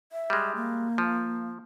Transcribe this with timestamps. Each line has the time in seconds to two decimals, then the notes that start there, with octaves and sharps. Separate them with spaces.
0.12 E5
0.30 G3 G#3
0.56 A#3
0.98 F3